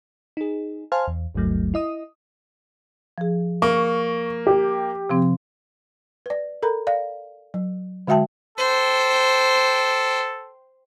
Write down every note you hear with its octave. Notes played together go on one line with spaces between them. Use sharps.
D#4 G#4
C5 F5 G#5 A5 C6 F6
E2
G1 D2 G2 F#3 A3
E4 D#5 D#6
F3 G#4
A#3 C#6
G4
C3 F3 C4
B4 D5
A4 A#4 A#5 B5
D5 F5
F#3
D3 G#3 F#4 E5 G5 A5
A4 C5 G5